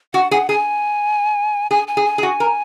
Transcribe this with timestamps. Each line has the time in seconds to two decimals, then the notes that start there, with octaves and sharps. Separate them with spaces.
0.14 F#4 F#5
0.31 G#4 F#5
0.49 G#4 G#5
1.71 G#4 G#5
1.88 G#5
1.97 G#4
2.05 G#5
2.18 G#4
2.23 F#4
2.40 A#4